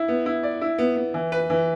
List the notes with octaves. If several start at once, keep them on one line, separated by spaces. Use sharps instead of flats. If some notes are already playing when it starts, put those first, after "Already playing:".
Already playing: E4
B3
E4
D5
E4
B3
B3
E3
B4
E3